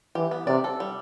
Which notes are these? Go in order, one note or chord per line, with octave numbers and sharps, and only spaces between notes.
E3 G4
B3
C3 D5
A4
G3